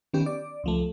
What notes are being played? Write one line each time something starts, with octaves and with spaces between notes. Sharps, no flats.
D#3 B3 C#4 G4
D5
C#2 F3 A3